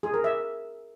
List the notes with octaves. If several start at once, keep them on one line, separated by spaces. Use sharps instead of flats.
G#4
A#4
E5